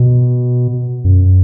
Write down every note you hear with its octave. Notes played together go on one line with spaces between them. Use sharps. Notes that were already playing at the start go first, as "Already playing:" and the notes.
Already playing: B2
F#2